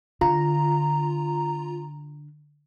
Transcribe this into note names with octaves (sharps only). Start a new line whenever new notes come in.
D3 F4 A#5